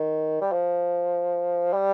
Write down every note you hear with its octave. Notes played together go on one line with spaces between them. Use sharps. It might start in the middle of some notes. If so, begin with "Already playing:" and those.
Already playing: D#3
G3
F3
G3